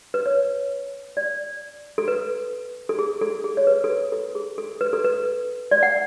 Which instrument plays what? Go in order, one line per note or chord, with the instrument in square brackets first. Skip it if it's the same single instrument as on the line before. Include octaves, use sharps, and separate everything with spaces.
[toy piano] B4
C#5
D5
A4
B4
A4
G#4
A4
G#4
C#5
B4
A4
B4
A4
G#4
A4
B4
A4
B4
D5
F#5